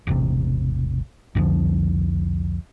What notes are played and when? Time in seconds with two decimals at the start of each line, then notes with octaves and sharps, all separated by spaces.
0.07 E1 A1 C3
1.35 C2 F2 D3 F3